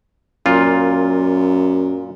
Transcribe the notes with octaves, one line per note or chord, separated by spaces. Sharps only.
F#2 A#2 F4